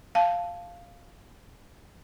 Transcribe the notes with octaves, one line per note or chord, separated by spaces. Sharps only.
F5 A5